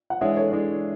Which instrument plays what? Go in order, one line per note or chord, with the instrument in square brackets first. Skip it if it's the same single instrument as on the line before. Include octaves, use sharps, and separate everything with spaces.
[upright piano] F#5
[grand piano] E3 G#3 D4 G#4 [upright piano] C#5 E5
[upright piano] A4 C#5
[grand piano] E3 G#3 D4 G#4